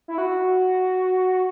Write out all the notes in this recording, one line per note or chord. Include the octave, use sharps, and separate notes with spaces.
E4
F#4